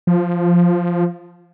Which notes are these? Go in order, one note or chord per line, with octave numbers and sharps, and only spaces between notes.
F3